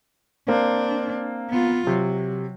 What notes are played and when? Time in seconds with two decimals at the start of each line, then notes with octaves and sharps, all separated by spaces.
0.48 A#3 C4 D4
1.49 B3 F4
1.87 C3 F#3